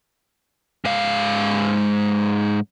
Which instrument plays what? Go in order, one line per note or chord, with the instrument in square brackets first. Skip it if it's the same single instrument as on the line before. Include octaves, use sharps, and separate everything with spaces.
[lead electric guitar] G#2 F5